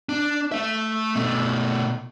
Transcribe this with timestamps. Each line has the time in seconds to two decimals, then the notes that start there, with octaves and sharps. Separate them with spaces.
0.09 D4
0.52 A3 E5
1.16 B2 A3